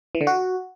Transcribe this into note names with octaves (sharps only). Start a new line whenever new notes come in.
E3
D3
F#4